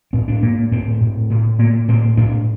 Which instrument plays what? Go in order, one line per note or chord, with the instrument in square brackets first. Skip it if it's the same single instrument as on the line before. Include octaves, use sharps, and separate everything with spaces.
[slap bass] A2 C4
D4
A2 A#3
A2 C4
A2
A2
A2 A#3
A2 C4
A2 D4